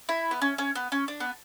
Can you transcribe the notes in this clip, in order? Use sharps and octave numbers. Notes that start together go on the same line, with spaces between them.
E4
B3
C#4
C#4
B3
C#4
D4
B3